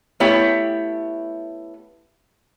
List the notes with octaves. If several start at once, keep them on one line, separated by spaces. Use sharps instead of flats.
A3 B3 E4 G4 C#5